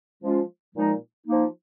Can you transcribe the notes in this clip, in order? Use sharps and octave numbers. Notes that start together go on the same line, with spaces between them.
F3 G#3 C#4 F4
A#2 F3 G#3 D#4
F3 A#3 D#4